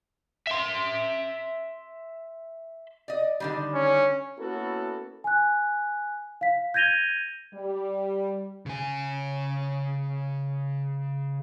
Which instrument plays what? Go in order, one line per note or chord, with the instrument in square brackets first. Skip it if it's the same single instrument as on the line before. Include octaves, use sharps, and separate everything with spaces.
[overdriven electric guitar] E5 C6
[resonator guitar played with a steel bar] D5 D#5
D3 D#3 G3
[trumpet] C#4
[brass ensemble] A#3 B3 C#4 E4 F#4 A4
[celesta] G#5 F#6
F5 B6
G6 G#6 A#6 D#7 F7 G7
[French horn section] G3
[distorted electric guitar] C#3 G#5